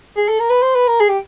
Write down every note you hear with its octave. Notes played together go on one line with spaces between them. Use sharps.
G#4
A4
A#4
B4
C5
B4
A#4
G#4
G4